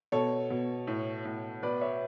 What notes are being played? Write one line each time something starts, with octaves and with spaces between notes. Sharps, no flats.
B2 A4 C#5
B2
A2
A2
B2 B4 D5
C#5 E5